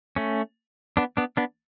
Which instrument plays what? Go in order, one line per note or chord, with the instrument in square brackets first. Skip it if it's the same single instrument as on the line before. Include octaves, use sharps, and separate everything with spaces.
[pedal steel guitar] A3 C#4
B3 D4
B3 D4
B3 D4